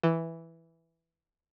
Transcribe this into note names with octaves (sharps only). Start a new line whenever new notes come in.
E3